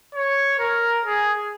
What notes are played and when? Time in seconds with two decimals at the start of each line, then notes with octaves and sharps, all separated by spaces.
0.14 C#5
0.59 A#4
1.05 G#4